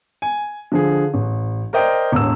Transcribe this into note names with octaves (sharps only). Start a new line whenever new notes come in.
G#5
D3 F3 G#4
A1
A#4 C5 D5 D#5 G5
E1 A1 E6